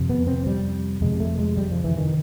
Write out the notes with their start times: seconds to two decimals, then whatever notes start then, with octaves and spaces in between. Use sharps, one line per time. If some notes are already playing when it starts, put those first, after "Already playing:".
Already playing: F2 C3
0.10 B3
0.27 C4
0.47 G3
1.01 F2 C3 G#3
1.20 A3
1.39 G#3
1.57 G3
1.71 F3
1.84 E3
1.98 D#3